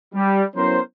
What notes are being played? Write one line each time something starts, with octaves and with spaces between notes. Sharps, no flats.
G3
F#3 B3 C#4 E4 A#4 C5